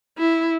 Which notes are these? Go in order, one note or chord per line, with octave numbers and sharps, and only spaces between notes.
E4